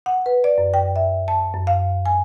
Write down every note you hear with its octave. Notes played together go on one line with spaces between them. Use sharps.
F#5
B4
D5
F#2
G5
E5
A5
F#2
F5
G#5